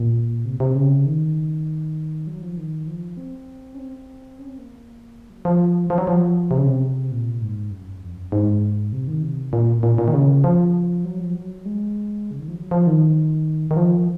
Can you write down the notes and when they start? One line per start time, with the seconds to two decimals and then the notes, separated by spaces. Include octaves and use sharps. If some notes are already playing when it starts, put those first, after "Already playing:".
Already playing: A#2
0.45 C3
0.60 C3
0.75 C#3
1.06 D#3
2.27 F#3
2.42 F3
2.57 D#3
2.87 F3
3.17 C4
3.74 C#4
3.79 C4
4.39 C#4
4.49 C4
4.58 A#3
5.30 F#3
5.45 F3
5.90 F3
5.98 F#3
6.07 F3
6.51 C3
6.58 C#3
6.66 C3
7.12 A#2
7.41 G#2
7.71 F#2
8.02 F2
8.17 F#2
8.32 G#2
8.93 C3
9.08 D#3
9.23 C3
9.53 A#2
9.83 A#2
9.98 A#2
10.08 D#3
10.14 C#3
10.44 F3
11.05 F#3
11.20 F3
11.35 F#3
11.65 G#3
12.31 C#3
12.40 D#3
12.48 F3
12.56 F#3
12.71 F3
12.87 D#3
13.71 D#3
13.77 F3